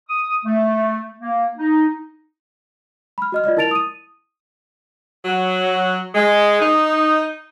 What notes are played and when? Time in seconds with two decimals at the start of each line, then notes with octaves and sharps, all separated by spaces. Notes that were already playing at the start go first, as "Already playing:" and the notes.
0.08 D#6
0.45 A3
1.19 A#3
1.57 D#4
3.18 B5 F6
3.32 F#4 D#5 F6
3.44 F4 D5 D#5 F6
3.57 E4 A#4 A5 A6 D7 F7
3.71 D#6 D#7
5.25 F#3
6.15 G#3
6.60 D#4